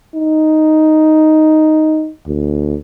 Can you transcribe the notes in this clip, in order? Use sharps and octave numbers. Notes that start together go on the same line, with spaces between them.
D#4
D2